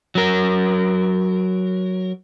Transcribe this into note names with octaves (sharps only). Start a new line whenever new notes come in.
F#3 A#4